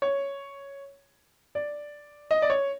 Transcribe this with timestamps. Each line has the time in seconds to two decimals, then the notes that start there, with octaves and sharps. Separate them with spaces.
0.02 C#5
1.55 D5
2.31 D#5
2.42 D5
2.50 C#5